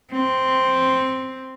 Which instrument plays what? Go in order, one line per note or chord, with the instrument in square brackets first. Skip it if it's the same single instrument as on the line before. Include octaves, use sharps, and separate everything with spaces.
[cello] C4